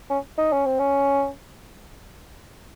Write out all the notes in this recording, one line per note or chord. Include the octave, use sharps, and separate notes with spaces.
C#4
D#4
C#4
C4
C#4